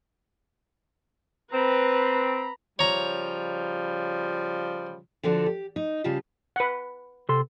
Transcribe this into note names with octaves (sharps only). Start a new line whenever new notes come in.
C4 B4 A#5 B5
C#3 F3 G3 C#5 A#5
D3 F3 D4 F#4 A4
G4
D#4
C#3 G3 F4 G4 A5
B4 F#5
C3 A4 C6